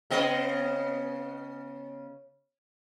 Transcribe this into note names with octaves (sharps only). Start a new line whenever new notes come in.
C#3 B3 D#5